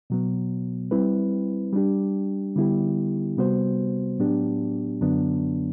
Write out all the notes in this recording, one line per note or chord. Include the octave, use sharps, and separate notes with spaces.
B2 F#3 B3
G3 C4 E4 B4
G3 D4 G4
D3 G3 B3 E4 G4
C3 G3 B3 F#4 C5
A2 F#3 B3 D4 G4
F#2 D3 F#3 B3 D4